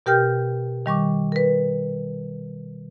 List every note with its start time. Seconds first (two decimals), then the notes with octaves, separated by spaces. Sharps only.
0.06 B2 G4 A#4 G5 F6 G6
0.86 D#3 G3 C#6 D6
1.32 A#4 B4